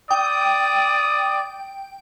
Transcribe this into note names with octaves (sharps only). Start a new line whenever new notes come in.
D5 G5 D#6